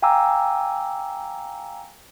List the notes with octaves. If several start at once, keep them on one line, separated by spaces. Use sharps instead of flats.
F5 G5 G#5 A#5 D6 E6